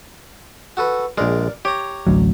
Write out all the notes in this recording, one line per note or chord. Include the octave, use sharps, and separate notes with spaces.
F#4 A4 B4
A#1 G#3 A#4 D5
G4 C#5 A#5
A1 D2 F#3